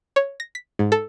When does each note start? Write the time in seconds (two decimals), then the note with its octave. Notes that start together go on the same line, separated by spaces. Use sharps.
0.16 C#5
0.40 A#6
0.55 B6
0.79 G#2
0.92 A4